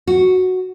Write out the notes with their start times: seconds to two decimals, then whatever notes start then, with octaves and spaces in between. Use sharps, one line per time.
0.07 F#4